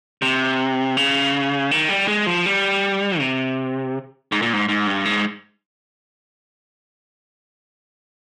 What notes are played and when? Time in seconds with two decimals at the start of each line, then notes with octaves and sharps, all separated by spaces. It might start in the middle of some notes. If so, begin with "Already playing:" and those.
0.22 C3
0.97 C#3
1.71 D#3
1.89 G3
2.08 G#3
2.27 F3
2.46 G3
3.20 C3
4.32 G#2
4.42 A#2
4.53 G#2
4.69 G#2
4.87 G2
5.05 G#2